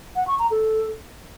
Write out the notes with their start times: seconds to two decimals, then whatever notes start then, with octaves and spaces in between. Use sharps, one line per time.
0.16 F#5
0.27 C#6
0.39 A#5
0.51 A4